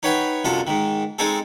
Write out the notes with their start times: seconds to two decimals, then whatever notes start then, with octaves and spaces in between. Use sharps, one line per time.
0.03 D#4 B4 C#5 F#5 G5 B5
0.44 C2 F#2 F4 A4 F#5
0.67 G#2 D#3
1.19 G#3 C4 D#4 G#4 A4